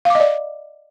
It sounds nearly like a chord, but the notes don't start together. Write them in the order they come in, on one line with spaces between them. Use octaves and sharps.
F5 D6 D#5 D5